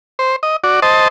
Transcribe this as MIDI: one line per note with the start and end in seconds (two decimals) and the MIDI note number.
0.19 0.36 72
0.43 0.56 75
0.64 0.80 66
0.64 0.80 74
0.82 1.08 72
0.82 1.08 75
0.82 1.08 81